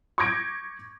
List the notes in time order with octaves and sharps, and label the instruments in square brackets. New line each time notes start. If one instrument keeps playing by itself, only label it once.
[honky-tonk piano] C#6 D6 G6 G#6 A#6 D7